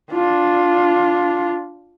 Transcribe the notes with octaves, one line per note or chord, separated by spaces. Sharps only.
D4 F4